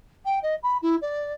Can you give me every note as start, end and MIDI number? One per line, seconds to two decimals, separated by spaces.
0.24 0.38 79
0.42 0.54 75
0.62 0.77 83
0.82 0.96 64
1.01 1.32 74